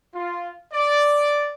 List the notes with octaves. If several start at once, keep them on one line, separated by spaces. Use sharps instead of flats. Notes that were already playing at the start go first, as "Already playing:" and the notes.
F4
D5